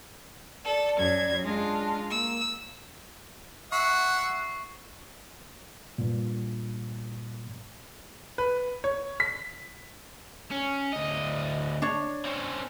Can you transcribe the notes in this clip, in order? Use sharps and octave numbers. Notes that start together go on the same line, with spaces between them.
A4 D5
F#2 G#6
G#3 D4 F4
A#3 E6
E5 F#5 C#6 C7
G2 A#2
B4
C#5
B6
C#4
D2 D#5
D4 C#5
C4 C#4